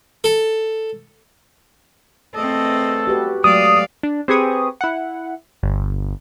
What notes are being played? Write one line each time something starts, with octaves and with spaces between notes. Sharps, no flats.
A4
E2 A3 C4 A4 D#5
F#4 G4 B4
F#3 G#3 A3 D5 F5 D#6
D4
C4 G4 G#4 B4 C#6 D#6
E4 F#5
G1